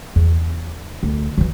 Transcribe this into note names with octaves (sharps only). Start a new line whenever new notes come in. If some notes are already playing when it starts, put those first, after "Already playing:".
E2
D2
E3 F#3